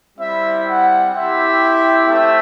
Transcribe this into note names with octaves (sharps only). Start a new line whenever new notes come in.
G3 C4 E4 E5
F#5
C4 E4 G4 E5
A3 C4 E5